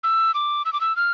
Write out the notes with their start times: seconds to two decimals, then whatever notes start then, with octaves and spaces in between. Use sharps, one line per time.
0.04 E6
0.34 D6
0.65 E6
0.73 D6
0.81 E6
0.97 F6